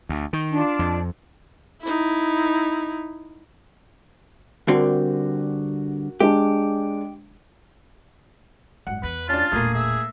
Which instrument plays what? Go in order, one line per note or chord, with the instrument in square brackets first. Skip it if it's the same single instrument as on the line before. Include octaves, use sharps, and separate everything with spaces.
[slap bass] D2
D#3
[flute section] D4 F4
[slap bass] F2
[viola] D#4 E4
[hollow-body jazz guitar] D3 G3 C4 [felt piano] F#4 A#4
[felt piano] G#3 D4 [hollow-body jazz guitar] G4
[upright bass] F#1 G#2 [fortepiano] F#5
[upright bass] E2 [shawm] B4
[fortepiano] C#4 D4 [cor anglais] F4 [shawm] A5
[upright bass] E1 A#2 [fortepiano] A3 A#3 [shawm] G#4
[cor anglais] G#4 [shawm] E5